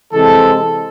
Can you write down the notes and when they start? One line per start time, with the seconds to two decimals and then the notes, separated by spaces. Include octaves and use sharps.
0.13 C3 E3 G#3 C4 A4